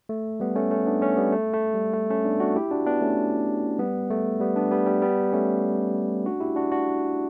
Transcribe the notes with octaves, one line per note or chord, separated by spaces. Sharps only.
A3
G3 B3
A3 C#4
A3 C#4
B3 D4
A3 C#4
G3 B3
A3
A3
G3
A3
A3 C#4
B3 D4
D4 F#4
E4 G4
D4 F#4
B3 D4
A3 C#4
G3 B3
A3
G3 B3
B3 D4
G3 B3
G3 B3
G3 B3
A3 C#4
D4 F#4
E4 G4
D4 F#4
D4 F#4